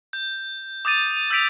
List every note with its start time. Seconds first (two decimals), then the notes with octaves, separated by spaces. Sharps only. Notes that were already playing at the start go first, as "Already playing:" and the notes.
0.13 G6
0.85 D6 D#6 G6 A6 D#7
1.17 D#7
1.30 E6 G6 B6 D7 F7